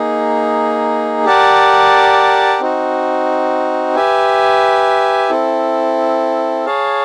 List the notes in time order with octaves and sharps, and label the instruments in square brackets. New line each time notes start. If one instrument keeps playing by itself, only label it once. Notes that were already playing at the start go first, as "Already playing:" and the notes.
Already playing: [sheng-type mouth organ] A#3 D#4 G#4
G4 A#4 D5 F#5 A5
C4 D#4 F#4
G4 B4 E5 G#5
C4 E4 A4
G#4 C#5 F5 A5